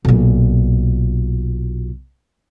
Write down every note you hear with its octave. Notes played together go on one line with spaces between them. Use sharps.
B1 A#2